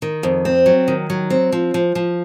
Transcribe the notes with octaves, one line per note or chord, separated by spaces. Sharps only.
D#3
F2
C4
F#3
D#3
F#3
C4
F3
F3
F3